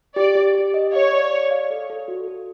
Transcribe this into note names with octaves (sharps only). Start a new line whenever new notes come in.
G4 D5
G4
G4
D#5
C#5 F5
D5
D5
F5
A4
A4
F#4
A4